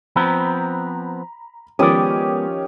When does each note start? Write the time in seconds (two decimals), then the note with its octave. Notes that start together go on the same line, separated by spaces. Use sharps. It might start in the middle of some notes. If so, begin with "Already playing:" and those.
0.16 F3 B3 C4 A#5 B5
1.79 D#3 F3 G#3 B3 C#4 G4 D5 D#6